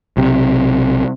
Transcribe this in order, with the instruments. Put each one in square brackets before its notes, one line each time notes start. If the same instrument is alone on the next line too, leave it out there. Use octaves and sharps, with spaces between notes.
[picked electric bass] B1 C3